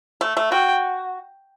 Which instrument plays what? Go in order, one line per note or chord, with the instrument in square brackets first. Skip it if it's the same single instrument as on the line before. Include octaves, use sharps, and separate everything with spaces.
[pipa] A3
A3
[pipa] F#4 [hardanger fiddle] G5